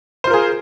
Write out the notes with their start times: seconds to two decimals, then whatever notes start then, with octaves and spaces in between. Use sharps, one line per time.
0.24 C5
0.27 F4
0.30 A#4
0.33 G#4